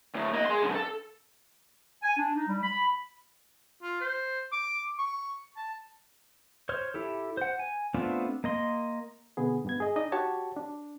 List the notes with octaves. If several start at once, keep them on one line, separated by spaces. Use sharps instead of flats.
D2 A2
A#3 D#5
G#4 C6
B1 D3
A4
G#5
D4
D#4
G3
B5
F4
C5
D6
C#6
A5
C5 C#5 F6
E4 G4 A4
C5 F#5
G#5
A3 B3 C4 D4 F4
A#3 D#5 C6
B2 D3 B3 G#4
G2 B3 G#6
G#4 D#5
D4 D#4 D5 D#5
F#4 G4 C#5 A5
D4